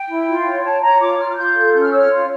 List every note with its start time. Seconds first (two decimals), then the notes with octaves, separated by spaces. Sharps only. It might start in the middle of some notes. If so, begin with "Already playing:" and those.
Already playing: G5
0.09 E4
0.27 F4
0.45 C#5
0.63 C#5 A5
0.81 C#5 A#5
1.00 F4 D6
1.18 F4 F6
1.29 F6
1.36 F4 G6
1.54 A4
1.72 C#4 G6
1.81 F6
1.91 C#5 E6
1.99 F6
2.10 F4